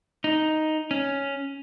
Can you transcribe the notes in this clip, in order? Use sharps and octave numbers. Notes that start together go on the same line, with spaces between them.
D#4
C#4